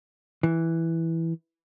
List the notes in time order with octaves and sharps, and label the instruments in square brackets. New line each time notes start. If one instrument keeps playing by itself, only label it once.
[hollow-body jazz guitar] E3